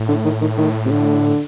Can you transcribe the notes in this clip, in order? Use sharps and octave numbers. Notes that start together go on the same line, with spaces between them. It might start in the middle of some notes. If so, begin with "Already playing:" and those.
Already playing: A2
D3
D#3
D#3
D#3
C3
D3